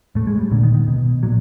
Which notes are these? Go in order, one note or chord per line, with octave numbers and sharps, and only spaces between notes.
A2 A3
G#3
G3
A#2 D3
D#3
D#3
B2
A#2 F#3